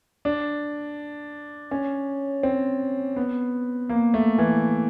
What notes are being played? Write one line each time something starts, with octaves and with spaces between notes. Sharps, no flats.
D4
C#4
C4
B3
A#3
A3
E3